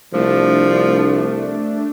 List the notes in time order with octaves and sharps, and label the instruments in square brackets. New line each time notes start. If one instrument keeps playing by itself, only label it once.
[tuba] C2 [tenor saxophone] F3 [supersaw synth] A3 D4